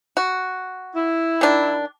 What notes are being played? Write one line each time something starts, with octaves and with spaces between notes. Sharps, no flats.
F#4
E4
D#3 D4